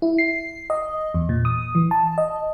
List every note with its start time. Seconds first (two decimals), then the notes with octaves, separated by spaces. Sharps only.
0.02 E4
0.18 C7
0.70 D#5
1.14 E2
1.29 A#2
1.45 D#6
1.75 E3
1.91 A5
2.18 D#5